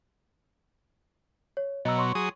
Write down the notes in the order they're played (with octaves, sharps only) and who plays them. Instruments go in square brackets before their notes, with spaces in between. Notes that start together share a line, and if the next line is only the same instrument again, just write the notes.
[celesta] C#5
[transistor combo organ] B2 F#3 [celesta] D#5 A#5 E6
[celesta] C#5 C6 C#6
[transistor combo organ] F#3 G#4 D#6